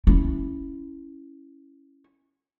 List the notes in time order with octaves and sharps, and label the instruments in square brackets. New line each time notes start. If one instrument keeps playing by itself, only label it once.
[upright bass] C#4 E4